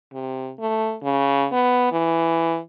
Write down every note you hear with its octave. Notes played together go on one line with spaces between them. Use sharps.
C3
A3
C#3
B3
E3